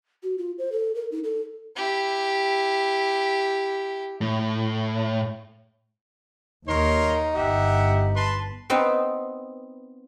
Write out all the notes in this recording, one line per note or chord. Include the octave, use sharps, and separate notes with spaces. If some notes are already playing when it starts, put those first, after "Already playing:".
F#4
F4
C5
A4
A#4
D#4
A4
E4 G4
A2
D#2 A#3 D#4 A#4 C#5 C6
G1 G4 E5 F#5
B4 A5 C6
B3 C4 D#4 B4